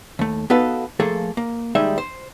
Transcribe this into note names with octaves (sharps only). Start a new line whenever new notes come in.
D#2 A3
B3 D#4 F#4 A4 B4 F5
F3 A3 A#3 G#4 A4
A#3
D#2 G3 G#3 D#4 E5
C5